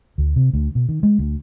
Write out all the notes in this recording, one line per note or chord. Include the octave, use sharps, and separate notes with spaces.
D2
C3
D2
B2
D#3
G#3
D2